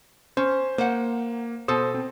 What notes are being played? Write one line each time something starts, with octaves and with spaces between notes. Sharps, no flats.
C#4 C5
A#3 C5 F#5
B2 A4 C5 D#6
C4